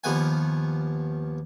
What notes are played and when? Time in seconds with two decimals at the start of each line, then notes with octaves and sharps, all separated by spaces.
0.04 D#2 F3 B3 F#5 G#5